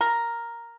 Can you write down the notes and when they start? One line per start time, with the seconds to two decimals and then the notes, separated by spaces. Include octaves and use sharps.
0.01 A#4